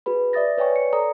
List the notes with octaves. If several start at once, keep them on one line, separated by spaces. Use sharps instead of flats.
F#4 G#4 B4 B5
D5 E5 D#6 A6 A#6
B4 C#5 D5 G5 G#5 C#6
C#7
A4 D5 A#5 D#6